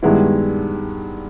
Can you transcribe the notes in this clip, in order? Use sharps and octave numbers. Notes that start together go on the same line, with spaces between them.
G2 D#3 G#3 B3 E4